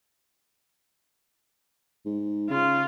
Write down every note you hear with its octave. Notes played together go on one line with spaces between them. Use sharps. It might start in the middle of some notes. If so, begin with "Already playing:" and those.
G#2
C#3 F4